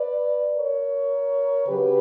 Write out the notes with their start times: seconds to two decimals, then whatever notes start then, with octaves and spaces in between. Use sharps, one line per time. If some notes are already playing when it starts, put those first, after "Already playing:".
Already playing: B4 D5
0.56 A#4 C#5
1.67 C#3 F#3 G4 B4